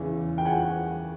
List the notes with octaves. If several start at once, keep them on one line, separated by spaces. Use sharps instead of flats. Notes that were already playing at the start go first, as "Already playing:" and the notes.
Already playing: E2 C#3 E3
G5
F#5 G#5